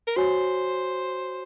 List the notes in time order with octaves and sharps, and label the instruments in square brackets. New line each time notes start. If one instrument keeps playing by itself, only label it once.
[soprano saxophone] A#4
[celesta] F#4 C#5 G#5 [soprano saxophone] C5